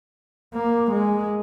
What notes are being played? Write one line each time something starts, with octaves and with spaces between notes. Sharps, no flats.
A#3
G#3